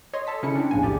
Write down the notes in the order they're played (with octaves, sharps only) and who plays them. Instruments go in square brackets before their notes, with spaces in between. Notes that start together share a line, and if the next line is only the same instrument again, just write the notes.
[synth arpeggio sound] C#5 D#5 C6
A4 A5 B6
C#3 C#4 E4 C#7
C4 D4
A#1 E2 A2 A#3 G#5
G#1 C#3 G4 D5